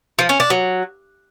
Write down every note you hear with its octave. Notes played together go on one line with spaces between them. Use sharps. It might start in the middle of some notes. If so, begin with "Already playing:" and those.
F3
C#4
D4
F#3